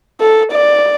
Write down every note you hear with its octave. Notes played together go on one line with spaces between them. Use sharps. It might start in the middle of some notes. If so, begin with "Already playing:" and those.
A4
D5